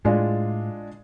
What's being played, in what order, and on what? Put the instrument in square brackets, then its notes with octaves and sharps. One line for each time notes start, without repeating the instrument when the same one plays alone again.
[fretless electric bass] A2 [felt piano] G#3 D4 F4